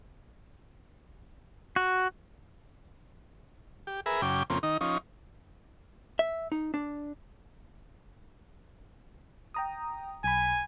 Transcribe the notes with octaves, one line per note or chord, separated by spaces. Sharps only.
F#4
G4
G#4 A#4 B4 E5
F#2 C#3 G5 D6
F2 C#3 A#3 C4
D#3 D#4
F3 C#4 D#4
E5
D#4
D4
G5 A#5 D#6
B1 G#5 B5